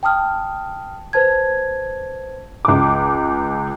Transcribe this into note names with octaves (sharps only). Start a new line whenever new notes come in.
G5 A5 D#6 F6
B4 C5 A5 G#6
C#2 D6